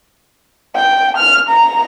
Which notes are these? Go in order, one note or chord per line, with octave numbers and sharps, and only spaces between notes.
G5
F6
A#5